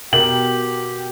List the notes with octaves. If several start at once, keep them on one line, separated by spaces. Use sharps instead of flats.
B2 G4 A#4 F#7